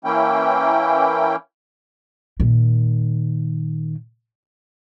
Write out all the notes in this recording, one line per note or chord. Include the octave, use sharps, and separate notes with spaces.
E3 A#3 C#4 E4 G5
A#2 D#3